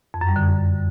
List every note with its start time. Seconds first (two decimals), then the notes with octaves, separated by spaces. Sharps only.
0.14 F2
0.21 F#2
0.29 G3
0.36 D3